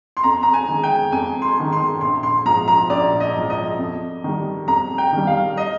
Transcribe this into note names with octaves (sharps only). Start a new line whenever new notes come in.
C6
F2 A#5
A#5
G#5
D#3 G#3
G5
F2 G#5
C6
D#3 G#3
C6
A#1 C6
C6
G#2 F3 A#5
A#5
A#1 D5
D#5
G#2 F3
D#5
F2
D#3 G3
F2 A#5
G5
D#3 G3
F5
D#5